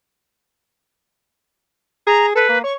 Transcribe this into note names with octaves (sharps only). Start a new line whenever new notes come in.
G#4 A#5
A4 B4
A#3
C#5 C#6